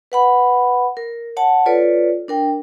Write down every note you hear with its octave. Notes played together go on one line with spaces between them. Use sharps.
B4 F#5 B5
A#4
C#5 F#5 A5
F4 A4 B4 C#5 D5
D4 A#4 G5